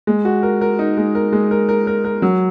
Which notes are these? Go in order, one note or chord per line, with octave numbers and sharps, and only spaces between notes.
G#3
F#4
A#4
A#4
D#4
G#3
A#4
G#3
A#4
A#4
A#4
A#4
F#3